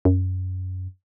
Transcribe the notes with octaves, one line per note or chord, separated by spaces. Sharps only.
F#2